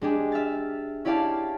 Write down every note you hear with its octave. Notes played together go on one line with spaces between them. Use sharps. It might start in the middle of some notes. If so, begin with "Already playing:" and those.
G#3 D4 G4 G#4
E5 F6 A6
C#4 E4 G4 D5 F5 A5